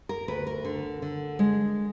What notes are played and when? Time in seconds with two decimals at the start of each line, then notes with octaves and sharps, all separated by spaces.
0.09 A#4
0.28 D2 B4
0.47 A#4
0.65 D3
1.02 D3
1.39 G#3